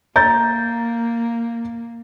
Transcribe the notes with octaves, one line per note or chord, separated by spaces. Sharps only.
A#3 A#5 G6 A6